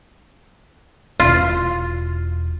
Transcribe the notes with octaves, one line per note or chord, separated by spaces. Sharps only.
E1 F4